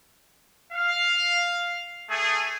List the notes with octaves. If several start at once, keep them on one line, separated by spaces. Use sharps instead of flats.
F5
A3 G#4